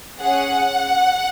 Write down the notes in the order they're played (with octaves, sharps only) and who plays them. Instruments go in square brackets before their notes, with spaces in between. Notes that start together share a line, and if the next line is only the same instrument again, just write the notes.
[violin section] C#4 G#4 F#5